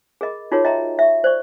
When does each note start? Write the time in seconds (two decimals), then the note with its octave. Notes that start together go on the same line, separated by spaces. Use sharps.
0.21 G#4 A#4 D#5 B5
0.52 D#4 F4 F#4 G#4 A#4 C#5
0.65 D#5 E5 G5 A#5 C6
0.99 E5 C#6
1.24 C5 D5 C#6